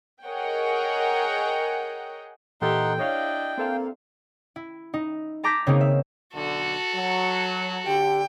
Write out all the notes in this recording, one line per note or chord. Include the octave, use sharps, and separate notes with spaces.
G#4 A#4 C#5 D#5 F#5 G5
A#2 E3 D#4 G4 A4 F#5 G5 C6
D4 E4 C#5 D#5 F5
A#3 C4 A4 F5
E4
D#4
A5 A#5 D6 G6 A#6 B6
C#3 A#3 C4 C#4 D#4
E5
B1 D3 F#4 A4
F#3
D3 G4 G5